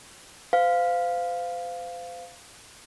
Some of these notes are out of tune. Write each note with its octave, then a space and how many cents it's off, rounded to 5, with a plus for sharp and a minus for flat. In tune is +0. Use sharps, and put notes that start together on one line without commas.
C5 -40 F5 +0